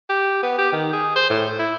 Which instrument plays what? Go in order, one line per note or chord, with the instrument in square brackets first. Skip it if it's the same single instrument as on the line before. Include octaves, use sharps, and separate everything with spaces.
[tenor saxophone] G4
B3
G4
D#3
G#4
C5
A2
E4